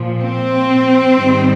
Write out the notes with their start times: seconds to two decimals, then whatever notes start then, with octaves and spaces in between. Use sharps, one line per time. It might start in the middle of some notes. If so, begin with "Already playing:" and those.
Already playing: A#2 F3
0.21 C4
1.15 G#2 D#3 G3